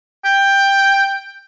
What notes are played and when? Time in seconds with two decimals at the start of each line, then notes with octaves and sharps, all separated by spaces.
0.25 G5